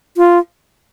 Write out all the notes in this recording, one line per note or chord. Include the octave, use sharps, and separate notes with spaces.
F4